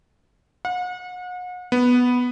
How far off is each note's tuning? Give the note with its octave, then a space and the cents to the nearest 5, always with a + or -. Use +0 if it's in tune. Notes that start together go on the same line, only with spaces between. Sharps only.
F#5 -40
B3 +0